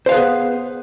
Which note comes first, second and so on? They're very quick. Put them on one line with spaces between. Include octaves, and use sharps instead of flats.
C5 F5 B4 G#4 B3